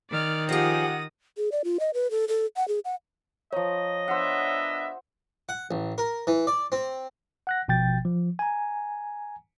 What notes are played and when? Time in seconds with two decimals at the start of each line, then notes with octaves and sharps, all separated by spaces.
0.11 D#3 D5 F6
0.49 F3 G4 G#4 F#5 D#6 A#6
1.37 G#4
1.52 D5
1.64 F4
1.80 D#5
1.94 B4
2.11 A4
2.28 A4
2.57 F#5
2.68 G#4
2.85 F#5
3.53 F3 C#5 D#5 A#5
4.08 B3 D4 C5 E5 F#5
5.49 F#5
5.71 A1
5.98 A#4
6.27 E3
6.47 D5
6.72 C4
7.47 F#5 F#6 A#6
7.68 G#1 B2 F3 G5 G6 A6
8.05 F3
8.39 G#5 A#5